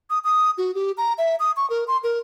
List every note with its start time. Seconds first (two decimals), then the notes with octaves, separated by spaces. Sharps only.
0.10 D#6
0.24 D#6
0.58 F#4
0.75 G4
0.98 A#5
1.18 E5
1.40 D#6
1.57 C#6
1.70 A#4
1.88 C6
2.04 A#4